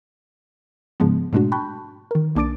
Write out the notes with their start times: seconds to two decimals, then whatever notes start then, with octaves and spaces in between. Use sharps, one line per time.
1.00 G#2 C#3 F3 G#3 B3
1.33 G#2 B2 G#3 A3 D4 F#4
1.52 G5 A5 B5 C#6 F#6 G6
2.11 D#3 A#4
2.35 B1 A#3 D4 D6 A6 D7